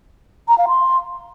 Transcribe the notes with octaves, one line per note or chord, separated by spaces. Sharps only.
A#5
F5
C6